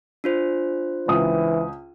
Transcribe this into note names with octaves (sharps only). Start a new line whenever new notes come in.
D4 F4 C5
C#2 E3 D#6